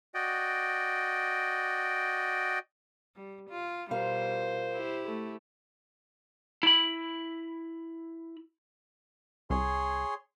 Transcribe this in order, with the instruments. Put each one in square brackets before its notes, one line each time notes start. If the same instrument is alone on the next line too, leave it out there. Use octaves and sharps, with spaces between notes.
[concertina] F#4 D5 D#5 G5
[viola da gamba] G3
F4
[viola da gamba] B2 G3 [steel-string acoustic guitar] F4 A#4 F5 [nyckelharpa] C5
[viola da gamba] E4 G4
[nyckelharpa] A3
[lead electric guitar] E4 B5
[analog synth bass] C2 [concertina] G#4 C#5 C6